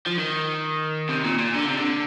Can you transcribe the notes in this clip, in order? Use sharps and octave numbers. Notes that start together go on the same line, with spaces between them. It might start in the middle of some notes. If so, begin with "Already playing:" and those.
F3
D#3
C3
A#2
A#2
D3
C3
D3